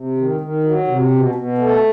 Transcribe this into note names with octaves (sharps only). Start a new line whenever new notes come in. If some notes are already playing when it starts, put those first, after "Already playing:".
Already playing: C3
D#3
D#3
F#3
C3
B2
B2
A3